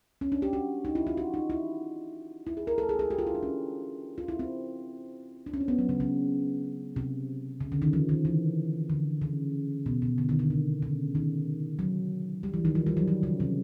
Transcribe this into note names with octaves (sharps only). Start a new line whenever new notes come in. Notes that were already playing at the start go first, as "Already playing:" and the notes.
C#4
D4
G4
F#4
D#4
E4
F4
F#4
D#4
E4
E4
G#4
A#4
A4
G#4
G#4
G4
F4
E4
D4
C#4
F4
E4
C4
D4
C#4
C4
B3
F#3
C#3
C#3
C3
C#3
D3
D#3
F3
D#3
E3
D3
C#3
B2
B2
D3
D#3
D3
C3
C#3
D#3
F#3
G3
E3
D#3
F3
G3
F#3
F3
C#3
C3